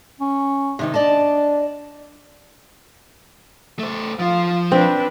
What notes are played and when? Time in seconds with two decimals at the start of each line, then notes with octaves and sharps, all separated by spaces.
0.21 C#4
0.79 C3 D#3 D#4
0.94 D4 D5 D#5 A5
3.79 A3 C5
4.19 F3 F4
4.72 C4 D4 B4